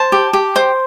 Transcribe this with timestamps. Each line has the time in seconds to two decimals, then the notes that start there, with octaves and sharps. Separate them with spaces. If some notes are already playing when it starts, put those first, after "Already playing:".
Already playing: C5 A5
0.12 G4
0.33 G4
0.56 C5